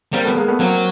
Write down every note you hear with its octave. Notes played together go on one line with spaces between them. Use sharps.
G3 A#3 C4
A3 B3
G#3 A#3
A3 B3
F#3 A#3 C4